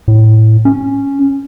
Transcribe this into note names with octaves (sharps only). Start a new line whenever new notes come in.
A2
C#4